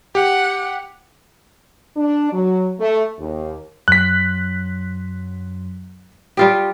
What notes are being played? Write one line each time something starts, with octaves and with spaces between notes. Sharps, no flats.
G4 F#5
D4
F#3
A3
D#2
F#2 F#3 C6 F#6 B6
G3 F4 G4 D#6